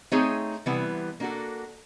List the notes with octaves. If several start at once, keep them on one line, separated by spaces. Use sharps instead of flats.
A3 C4 D#4 G#4 C#5
C3 E3 G3 B3
A#3 D4 F#4 A4